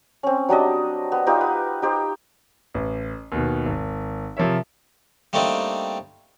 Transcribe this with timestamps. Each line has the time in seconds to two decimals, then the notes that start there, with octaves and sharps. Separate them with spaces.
0.23 C4 C#4
0.49 F#3 G3 D4 D#5
1.12 B3
1.27 B3 D#4 F4 G4
1.41 B4
1.82 D#4 G4 C5
2.74 A1
3.32 D#2 B2
3.66 G#1
4.37 C3 F3 A#4 C#5 E5
5.33 G3 A3 A#3 C4 D4 D#4